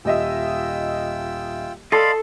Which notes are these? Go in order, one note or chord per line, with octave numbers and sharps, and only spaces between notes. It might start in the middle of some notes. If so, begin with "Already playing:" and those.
D#1 F4 D#5 E5 G5 E6
A4 D5 D#5 F5 A5 B5 C6